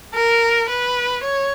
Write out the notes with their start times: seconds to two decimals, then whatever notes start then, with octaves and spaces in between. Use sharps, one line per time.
0.14 A#4
0.69 B4
1.24 C#5